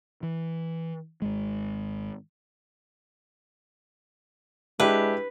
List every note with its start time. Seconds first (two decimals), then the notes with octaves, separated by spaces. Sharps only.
0.23 E3
1.22 G#1 G#3
4.80 G#3 D4 E4 G4 B4